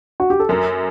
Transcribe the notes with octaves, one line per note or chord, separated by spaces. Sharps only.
F#4
G4
A4
F#2 A#4